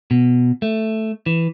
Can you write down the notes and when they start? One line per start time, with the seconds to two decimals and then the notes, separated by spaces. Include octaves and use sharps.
0.11 B2
0.62 A3
1.26 E3